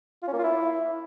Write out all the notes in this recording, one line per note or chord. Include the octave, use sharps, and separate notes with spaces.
F4
C#4
A#3
F4
E4